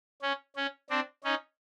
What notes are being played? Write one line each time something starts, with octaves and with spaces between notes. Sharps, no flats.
C#4
C#4
C4 D4
C#4 D#4